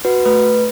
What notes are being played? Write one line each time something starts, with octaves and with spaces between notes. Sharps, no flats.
F#4 B4
A3 B4